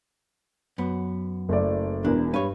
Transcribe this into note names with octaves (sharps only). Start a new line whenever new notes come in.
F#2 B3
F#1 A3 D5
E1 E2 D4 A#4
G2 B4 C#5